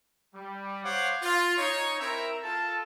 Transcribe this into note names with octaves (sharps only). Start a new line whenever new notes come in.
G3
C5 C#5 F5 F#5 D6
F4
D#4 C#5
C4 E4 A#4 E5 A#5
F4 A4 A5